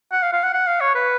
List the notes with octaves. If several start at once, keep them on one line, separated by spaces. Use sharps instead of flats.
F#5
F5
F5
F#5
F#5
F5
C#5
B4